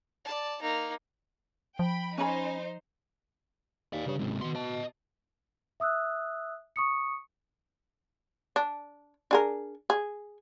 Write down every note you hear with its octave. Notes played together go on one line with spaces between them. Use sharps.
D5 A5
A#3 D#4
F3 G5 B5
C#4 D#4 C5 G#5 B5
D#2 D5 F5
G2 C#3 C#5
F#1 G#2 C3
B2 D#3 C6
D#5 A5
E5 D#6 E6 F#6
C#6 D#6 C#7
D4
D4 G#4 A#4
G#4